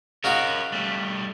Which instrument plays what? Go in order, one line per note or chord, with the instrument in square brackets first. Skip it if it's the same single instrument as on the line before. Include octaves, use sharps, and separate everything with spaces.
[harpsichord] C#3 D#4 F#4 [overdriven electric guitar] A#4 C#5
[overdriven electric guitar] G3 A3